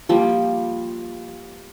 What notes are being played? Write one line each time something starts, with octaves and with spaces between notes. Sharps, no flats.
F3 G3 A#3